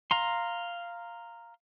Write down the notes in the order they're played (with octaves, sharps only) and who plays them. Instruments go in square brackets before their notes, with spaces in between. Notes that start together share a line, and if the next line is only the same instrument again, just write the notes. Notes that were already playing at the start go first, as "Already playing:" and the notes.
[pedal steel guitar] F5 A#5 C6